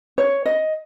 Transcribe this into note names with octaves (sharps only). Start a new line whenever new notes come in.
C#5
D#5